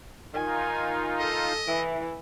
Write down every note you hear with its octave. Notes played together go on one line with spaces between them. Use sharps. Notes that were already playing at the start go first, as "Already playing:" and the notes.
D#3 D#4 F4 G#5
A4 D#5
E3 E4